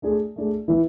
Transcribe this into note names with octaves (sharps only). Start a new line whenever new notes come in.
A3 D4 G#4
A3 D4 G#4
E3 B3 E4 B4